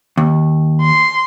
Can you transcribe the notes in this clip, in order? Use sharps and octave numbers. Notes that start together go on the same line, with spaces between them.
D#2
C6